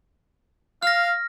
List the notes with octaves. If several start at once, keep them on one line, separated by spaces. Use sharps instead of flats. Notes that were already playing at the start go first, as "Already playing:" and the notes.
F5 F6 A#6